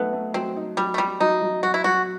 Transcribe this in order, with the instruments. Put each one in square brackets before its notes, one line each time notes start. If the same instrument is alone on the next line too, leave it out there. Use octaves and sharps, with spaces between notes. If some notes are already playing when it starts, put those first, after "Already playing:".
Already playing: [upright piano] F#3 A3 D#4 [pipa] B3
[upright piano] A3
[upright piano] F#3 [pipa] C4
[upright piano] D#4
[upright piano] F#3 [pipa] G3
[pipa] A3
[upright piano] F#3 [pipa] G3
[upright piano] F#3 [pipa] D#4
[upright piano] F#3
[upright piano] F#3 [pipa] F#4
[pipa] E4
[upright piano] F#3 [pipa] F#4